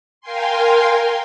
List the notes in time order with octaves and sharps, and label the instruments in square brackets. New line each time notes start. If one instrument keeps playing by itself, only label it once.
[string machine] A#4 F5 G5 G#5 C6